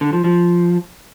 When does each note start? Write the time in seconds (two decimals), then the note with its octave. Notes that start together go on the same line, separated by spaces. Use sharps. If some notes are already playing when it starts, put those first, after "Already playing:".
0.01 D3
0.13 F3
0.24 F3